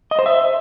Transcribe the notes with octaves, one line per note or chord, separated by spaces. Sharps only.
D#5
C5
E5